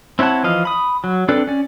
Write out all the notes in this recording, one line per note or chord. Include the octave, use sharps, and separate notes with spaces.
C4 E4 C#5 F#5 A5
E3 F3 D#5 F5
B5 D#6
F#3
C4 D4 A4 B4 D5
C#4 D5